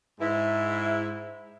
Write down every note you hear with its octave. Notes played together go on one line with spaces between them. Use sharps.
G#2 E4